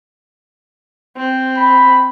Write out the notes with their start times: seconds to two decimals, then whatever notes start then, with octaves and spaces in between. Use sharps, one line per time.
1.17 C4
1.56 B5